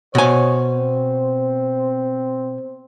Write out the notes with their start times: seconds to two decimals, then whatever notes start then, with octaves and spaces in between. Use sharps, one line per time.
0.15 B2 C5 C#5 G#5
0.74 C4